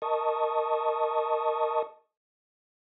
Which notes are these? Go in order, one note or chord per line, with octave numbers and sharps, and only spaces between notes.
A#4 D#5 A5 C#6 D#6